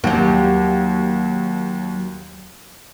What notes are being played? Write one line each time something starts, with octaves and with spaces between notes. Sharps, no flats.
D#2 F#3 G4